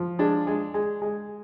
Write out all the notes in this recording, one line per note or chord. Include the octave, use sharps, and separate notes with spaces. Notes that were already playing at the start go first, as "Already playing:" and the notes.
Already playing: F3
G#3 D4
G#3
G#3
G#3